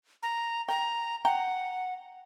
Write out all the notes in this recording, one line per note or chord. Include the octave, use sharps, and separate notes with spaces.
A#5
G5 A#5
F#5 G5 A#5